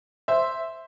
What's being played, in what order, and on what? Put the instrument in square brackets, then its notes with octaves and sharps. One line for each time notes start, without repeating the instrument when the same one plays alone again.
[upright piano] C5 E5